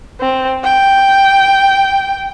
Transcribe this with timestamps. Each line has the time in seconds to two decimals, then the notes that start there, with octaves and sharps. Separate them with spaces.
0.20 C4
0.63 G5